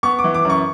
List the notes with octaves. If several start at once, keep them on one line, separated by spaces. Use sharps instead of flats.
B3 C#6
D6
E3
D6
F#2 C#6